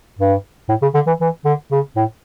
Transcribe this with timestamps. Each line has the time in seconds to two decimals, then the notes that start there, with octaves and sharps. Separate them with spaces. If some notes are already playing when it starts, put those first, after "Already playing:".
0.19 G2
0.69 A2
0.82 C#3
0.94 D3
1.07 E3
1.21 E3
1.45 D3
1.72 C#3
1.96 A2